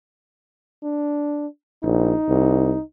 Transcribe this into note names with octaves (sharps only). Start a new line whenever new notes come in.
D4
A#1 D#4
C2